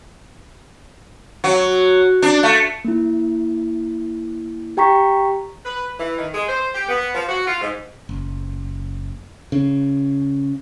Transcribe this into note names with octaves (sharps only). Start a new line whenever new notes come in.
F#3
D4
A3
A#3 E4
G4 G5 A#5 C#6 B6
B4
E3
D#3
G#3
C5
G4
B3
F3
F#4
F4
G#2
F#1
C#3